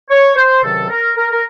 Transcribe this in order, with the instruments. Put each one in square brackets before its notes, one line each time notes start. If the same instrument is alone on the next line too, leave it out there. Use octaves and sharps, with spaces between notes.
[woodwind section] C#5
C5
C#2 C3 D#3 F#3 C4 A4
A#4
A#4
A#4